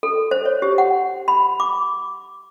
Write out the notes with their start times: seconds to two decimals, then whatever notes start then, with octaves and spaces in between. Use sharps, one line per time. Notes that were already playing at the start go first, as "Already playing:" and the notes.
0.03 A4
0.31 C5
0.45 C#5
0.62 G4
0.78 F#5
1.28 B5
1.60 D6